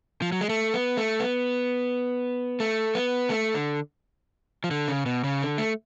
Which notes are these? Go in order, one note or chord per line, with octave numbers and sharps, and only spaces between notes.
F3
F#3
G#3
A3
B3
A3
B3
A3
B3
A3
D3
F3
D3
C#3
B2
C#3
D3
A3